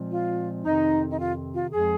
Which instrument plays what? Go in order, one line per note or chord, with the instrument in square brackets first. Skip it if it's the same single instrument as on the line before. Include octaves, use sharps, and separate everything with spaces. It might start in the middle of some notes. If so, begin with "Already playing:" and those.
Already playing: [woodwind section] A#2 F3 G#3 C4
F4
F2 C3 D#3 C4 D#4
D#4
F4
F4
F2 F3 G#3 G#4